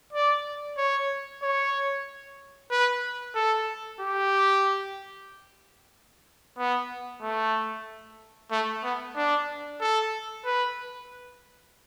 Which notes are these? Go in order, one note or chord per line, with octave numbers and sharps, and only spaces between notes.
D5
C#5
C#5
B4
A4
G4
B3
A3
A3
B3
D4
A4
B4